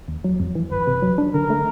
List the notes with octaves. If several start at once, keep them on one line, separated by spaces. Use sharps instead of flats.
D#2
F#3
F2
E3
G1 B4
C3
F#3
D4
D3 A#4
A3